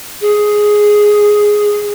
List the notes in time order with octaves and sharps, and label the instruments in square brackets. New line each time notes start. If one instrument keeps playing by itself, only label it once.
[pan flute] G#4